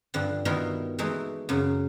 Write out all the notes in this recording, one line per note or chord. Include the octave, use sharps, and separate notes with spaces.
G2 D3 F3
B2 D#3 E4 F4 A#4 E5
E3 G#3 A3 D#4
F#2 C#3